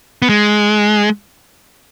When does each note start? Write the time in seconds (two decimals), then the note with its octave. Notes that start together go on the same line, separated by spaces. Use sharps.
0.22 B3
0.29 G#3